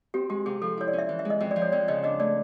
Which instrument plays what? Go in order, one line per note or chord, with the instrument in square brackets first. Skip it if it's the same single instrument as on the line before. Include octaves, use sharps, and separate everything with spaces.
[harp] C4 [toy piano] G4
[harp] G#3 [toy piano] G4
[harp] C3 [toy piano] G#4
[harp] F3 [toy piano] A4
[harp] E4 [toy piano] C#5
[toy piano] D5
[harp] C#4
[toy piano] E5
[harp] E3
[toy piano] E5
[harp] G#3
[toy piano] D#5
[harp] F2 [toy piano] D#5
[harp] F3 [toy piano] D5
[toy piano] C#5
[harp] F2 [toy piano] D5
[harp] C#3 [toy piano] D#5
[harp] D4 [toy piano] D#5
[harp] A3 [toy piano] D5